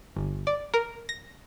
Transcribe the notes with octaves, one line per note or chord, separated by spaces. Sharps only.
G1
D5
A#4
A#6